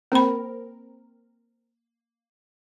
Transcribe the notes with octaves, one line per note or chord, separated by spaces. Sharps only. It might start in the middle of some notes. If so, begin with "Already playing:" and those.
A#3 C4 A#4 B5